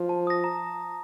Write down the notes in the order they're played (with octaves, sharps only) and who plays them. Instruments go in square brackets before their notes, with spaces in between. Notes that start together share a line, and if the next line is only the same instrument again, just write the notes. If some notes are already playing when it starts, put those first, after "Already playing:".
Already playing: [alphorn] F3
[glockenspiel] A5
D#6 A#6
A#5